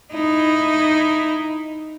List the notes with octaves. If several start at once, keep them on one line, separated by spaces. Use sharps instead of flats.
D#4 E4